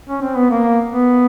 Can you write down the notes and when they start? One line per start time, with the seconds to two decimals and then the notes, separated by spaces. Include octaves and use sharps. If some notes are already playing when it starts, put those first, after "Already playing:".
0.09 C#4
0.22 C4
0.36 B3
0.51 A#3
0.90 B3